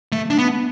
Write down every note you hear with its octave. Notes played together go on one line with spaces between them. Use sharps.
A3
D4
B3